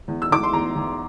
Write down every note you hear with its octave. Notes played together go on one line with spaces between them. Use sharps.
E2
E6
E2 D6
C6
E2 A#5
E2